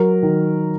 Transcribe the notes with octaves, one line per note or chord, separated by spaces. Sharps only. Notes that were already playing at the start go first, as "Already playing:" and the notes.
Already playing: F#3 A#4
D#3